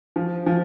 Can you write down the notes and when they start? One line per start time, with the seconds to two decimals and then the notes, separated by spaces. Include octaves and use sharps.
0.16 F3
0.46 F3